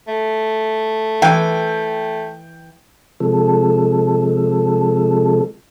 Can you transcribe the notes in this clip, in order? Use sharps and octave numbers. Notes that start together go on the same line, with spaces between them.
A3
E3 G5
C3 F3 G#3 A4